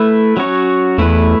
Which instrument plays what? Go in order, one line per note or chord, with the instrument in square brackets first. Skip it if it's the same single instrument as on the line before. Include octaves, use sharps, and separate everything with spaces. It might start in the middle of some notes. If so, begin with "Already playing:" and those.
Already playing: [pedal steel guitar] A3 E4 B4
F#3 C#4 F#4 C#5
[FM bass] E2 [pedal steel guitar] A3 E4 B4